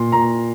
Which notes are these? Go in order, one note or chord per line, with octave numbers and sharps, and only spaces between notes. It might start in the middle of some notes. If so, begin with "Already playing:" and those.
Already playing: A#2 C6
A#2 A#5